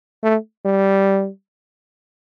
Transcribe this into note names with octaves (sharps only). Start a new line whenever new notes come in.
A3
G3